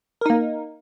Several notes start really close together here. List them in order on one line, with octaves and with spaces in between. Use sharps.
A#4 D#4 A#3